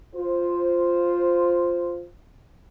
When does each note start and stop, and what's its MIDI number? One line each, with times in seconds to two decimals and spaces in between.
0.14 2.05 65
0.14 2.05 72